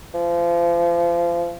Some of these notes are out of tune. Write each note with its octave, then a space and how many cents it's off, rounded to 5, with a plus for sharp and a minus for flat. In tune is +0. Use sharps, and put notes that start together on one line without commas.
F3 -30